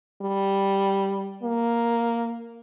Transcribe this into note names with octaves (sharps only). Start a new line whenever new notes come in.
G3
A#3